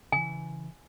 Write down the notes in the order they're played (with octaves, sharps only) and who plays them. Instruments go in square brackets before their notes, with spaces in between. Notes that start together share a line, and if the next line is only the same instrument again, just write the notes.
[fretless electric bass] C#3 E3 [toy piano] G#5